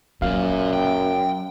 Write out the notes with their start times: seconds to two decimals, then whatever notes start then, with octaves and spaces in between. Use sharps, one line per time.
0.22 F#2 A#2 F#3 F5
0.73 G5